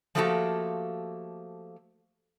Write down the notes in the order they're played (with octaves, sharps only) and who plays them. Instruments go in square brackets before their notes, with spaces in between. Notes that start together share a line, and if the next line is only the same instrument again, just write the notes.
[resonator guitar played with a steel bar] F3 A3 A#3 F#4 G4 A4